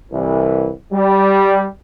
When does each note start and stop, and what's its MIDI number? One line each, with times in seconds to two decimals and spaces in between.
0.12 0.69 36
0.12 0.69 52
0.93 1.66 55